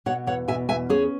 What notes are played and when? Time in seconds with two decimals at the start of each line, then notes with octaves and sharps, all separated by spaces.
0.06 B2 C#5 F#5
0.27 E2 C#5 F#5
0.48 B2 E5 G#5
0.69 E2 E5 G#5
0.90 C#4 G#4 C#5